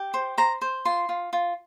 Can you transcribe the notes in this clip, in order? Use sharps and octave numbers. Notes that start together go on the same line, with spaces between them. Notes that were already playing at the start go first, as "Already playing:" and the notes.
Already playing: G4
C5
C5 A#5
C5
F4 C6
F4
F4